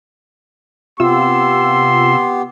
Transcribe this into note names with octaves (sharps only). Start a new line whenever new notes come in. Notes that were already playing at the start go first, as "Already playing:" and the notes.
C3 B3 F4 G4 C6 E6